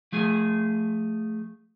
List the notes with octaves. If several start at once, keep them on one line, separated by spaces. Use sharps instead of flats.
F3 A3 G#4